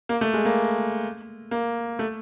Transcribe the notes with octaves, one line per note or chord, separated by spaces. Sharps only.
A#3
A3
G#3
A#3
A#3
A3